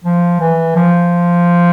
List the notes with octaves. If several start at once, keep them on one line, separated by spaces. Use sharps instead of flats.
F3
E3
F3